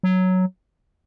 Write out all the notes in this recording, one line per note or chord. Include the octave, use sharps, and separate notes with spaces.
F#3